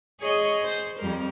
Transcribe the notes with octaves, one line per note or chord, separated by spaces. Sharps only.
G#4 C#5 D#5
C5
F2 G3 A#4